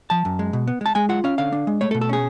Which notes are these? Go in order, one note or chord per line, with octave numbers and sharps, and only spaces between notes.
F3 A5
F#2
G#3
B2
B3
G#3 A5
G#3 G#5
F4 F#5
C#4 F5
D3 F5
D4
G#3
A3 C#5
A4
B2
A4
C#4 G#4